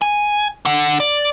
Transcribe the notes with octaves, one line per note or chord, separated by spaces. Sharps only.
G#5
D3 F#5
D5